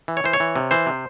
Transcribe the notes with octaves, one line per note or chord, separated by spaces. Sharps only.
E3
C#5
E3 C5
C#5
E3
C3
E3 C5
C3